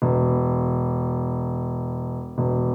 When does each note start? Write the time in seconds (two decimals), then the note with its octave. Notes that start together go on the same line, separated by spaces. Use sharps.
0.02 E1
2.38 E1